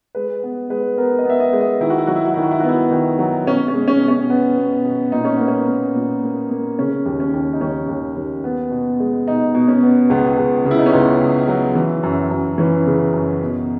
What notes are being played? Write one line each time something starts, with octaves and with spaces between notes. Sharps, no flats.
G#3 B4
B3
G#3 B4
B3 A#4
D#5
B3 E5
D#5
G#3
D#5
D#3 E4
F#4
E4
F#3 F#4
E4
F#4
D#3 E4
F#4
E4
B3 F#4
E4
D#3
F#3
B2 C#4
C#4
G#3
C#4
B2
C#4
B3
B2
B2
A#2 D#4
C#4
A#3 B3
C#4
A#3
A#2
A#3
A#3
C#3 C#4
D#2
C#4
D#2
D#4
D#2 C#4
D#2
D#2
B3
B2
G#3
B2 D#4
B2
C#4
B3
C#2 B3
C#2
C#3
E4
D#4
C#4
C#2 B3
C#2
F#3
E3
F#2
F#2
E3 C#4
C#3
F#2
B2